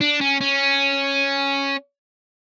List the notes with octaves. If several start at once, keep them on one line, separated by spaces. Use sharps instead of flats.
D4
C#4
C#4